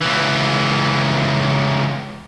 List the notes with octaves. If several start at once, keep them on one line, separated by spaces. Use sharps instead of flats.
C#2 E3